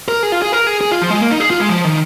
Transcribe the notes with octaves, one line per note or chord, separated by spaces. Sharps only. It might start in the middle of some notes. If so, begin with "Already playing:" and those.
A#4
G#4
F4
G#4
A#4
G#4
G#4
F4
F3
G#3
A#3
D#4
G#4
F4
G#3
F3
D#3